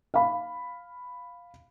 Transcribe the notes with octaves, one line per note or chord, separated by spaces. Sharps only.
F5 B5